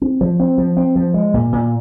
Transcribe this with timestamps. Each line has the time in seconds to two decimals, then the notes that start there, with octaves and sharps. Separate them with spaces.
0.01 C4
0.21 F3
0.40 C4
0.58 F3
0.77 C4
0.96 F3
1.14 G#3
1.34 A#2
1.52 A#2